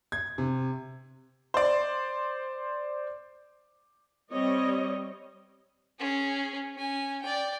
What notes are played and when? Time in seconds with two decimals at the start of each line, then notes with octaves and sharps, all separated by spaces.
0.12 G#6
0.38 C3
1.54 C5 D5
4.32 G3 C4 C#5 D#5
5.99 C#4 G#4
6.76 C#4 G#5
7.22 D5 G5